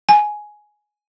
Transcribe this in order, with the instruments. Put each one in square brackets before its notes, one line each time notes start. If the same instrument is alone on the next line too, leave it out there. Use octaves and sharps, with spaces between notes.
[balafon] G#5